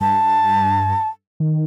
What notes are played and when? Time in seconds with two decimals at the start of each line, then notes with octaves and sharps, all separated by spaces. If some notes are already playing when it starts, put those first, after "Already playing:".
0.01 G2 A5
1.40 D#3